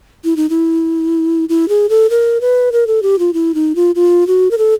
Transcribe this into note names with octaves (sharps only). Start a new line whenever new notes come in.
E4
D#4
E4
E4
G#4
A4
A#4
B4
A#4
A4
G4
F4
E4
D#4
F4
F4
F#4
A#4
A4